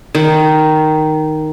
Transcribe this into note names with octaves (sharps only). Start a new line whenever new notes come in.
D#3